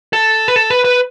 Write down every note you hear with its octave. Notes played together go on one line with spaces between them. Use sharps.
A4
B4
A4
B4
B4